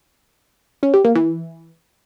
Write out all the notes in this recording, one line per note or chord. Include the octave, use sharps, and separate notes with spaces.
C#4
G4
A#3
E3